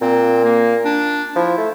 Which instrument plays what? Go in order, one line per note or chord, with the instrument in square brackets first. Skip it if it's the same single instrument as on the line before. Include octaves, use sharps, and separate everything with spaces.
[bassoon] A#2 [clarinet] C4
[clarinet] A#3
D4
[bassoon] F3 [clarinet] E4
[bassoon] A3